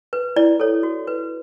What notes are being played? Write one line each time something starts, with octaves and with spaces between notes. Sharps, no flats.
B4
E4 D5
A4 C#5
F#4
B4